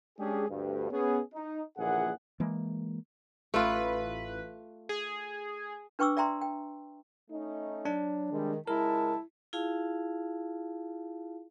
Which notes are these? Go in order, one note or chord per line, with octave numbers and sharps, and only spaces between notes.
G#3 C#4 D4 G4 G#4
D2 G2
B3 C#4 G#4
D#4
A#1 A#2 C#3 E3 G#4 F#5
E3 G#3 A#3
A1 A3 F4 B4
G#4
D4 B4 G5 C#6 D6 E6
D5 E5 G5 A#5 C6
G5
A3 C#4 D#4
F#3 D4
C3 D#3 G3 G#3
C#2 G#3 E4 A#4 A5
E4 F4 G#4 F5 A5